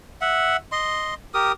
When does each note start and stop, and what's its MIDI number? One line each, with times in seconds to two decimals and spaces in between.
0.21 0.57 76
0.21 0.57 78
0.72 1.14 75
0.72 1.14 84
1.34 1.52 67
1.34 1.52 70
1.34 1.52 87